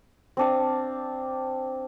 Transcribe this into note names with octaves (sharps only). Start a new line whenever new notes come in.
C4 D4 F5